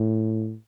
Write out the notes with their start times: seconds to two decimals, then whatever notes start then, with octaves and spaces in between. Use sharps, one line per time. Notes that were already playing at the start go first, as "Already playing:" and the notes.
Already playing: A2